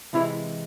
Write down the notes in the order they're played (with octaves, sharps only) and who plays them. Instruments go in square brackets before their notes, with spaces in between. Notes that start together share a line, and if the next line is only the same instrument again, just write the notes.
[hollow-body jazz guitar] C3 E3 G#3 [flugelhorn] E4